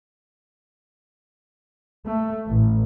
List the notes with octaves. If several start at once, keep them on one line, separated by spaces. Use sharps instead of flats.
A3
A1